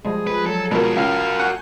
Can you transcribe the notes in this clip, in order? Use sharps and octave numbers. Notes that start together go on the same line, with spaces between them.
F3 G3 G#3 G#4
B4
F#3 A4
B2 G#3 F4 A#4 A5
C#2 F#4 A#4 F5
F#5 G#5 C#6 G6